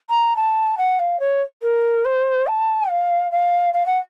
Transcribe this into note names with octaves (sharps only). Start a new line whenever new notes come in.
A#5
A5
F#5
F5
C#5
A#4
C5
A5
F5
F5
F5
F#5